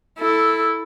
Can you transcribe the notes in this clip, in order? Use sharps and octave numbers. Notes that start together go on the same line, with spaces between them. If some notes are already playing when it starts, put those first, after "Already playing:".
E4 A4